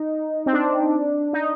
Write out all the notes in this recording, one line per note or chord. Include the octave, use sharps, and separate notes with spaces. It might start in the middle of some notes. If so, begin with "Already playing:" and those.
Already playing: D#4
C4
D4
D#4